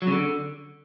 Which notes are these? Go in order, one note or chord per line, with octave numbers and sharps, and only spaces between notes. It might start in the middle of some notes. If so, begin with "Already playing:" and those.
F#3
C#3
D3